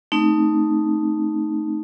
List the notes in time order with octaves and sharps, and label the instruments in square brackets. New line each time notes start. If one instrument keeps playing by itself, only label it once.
[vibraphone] A3 C4 D#4